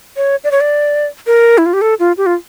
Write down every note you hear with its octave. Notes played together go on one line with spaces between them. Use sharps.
C#5
D5
C#5
D5
A#4
E4
F4
G4
A4
F4
G4
F4